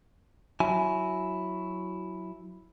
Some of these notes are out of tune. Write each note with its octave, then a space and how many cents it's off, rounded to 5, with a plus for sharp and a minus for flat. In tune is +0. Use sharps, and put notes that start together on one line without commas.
F#3 +0 E4 +0 G#5 +20